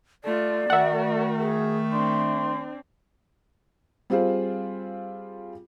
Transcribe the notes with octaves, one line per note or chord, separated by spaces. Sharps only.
A3 F4 D5
D#3 A3 F#4 A#4 E5 F#5
G#4
C4 D4 C6
G3 C4 F4 G#4 C5